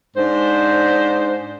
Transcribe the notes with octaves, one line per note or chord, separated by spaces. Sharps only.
G#2 D4 C5